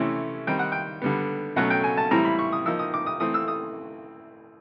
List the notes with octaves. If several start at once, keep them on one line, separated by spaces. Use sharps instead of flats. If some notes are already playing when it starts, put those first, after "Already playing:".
Already playing: C3 E3 A3 C#4 E4
D#3 G3 C4 D#4 G5
F#5
G5
D3 G3 B3
B2 F#3 A3 C#4 F#5
G5
G#5
A5
A2 E3 G3 C4 E4 A#5
B5
C#6
D#6
F3 A#3 D#4 E6
D#6
D6
D#6
E3 A3 C4 D#6
E6
D#6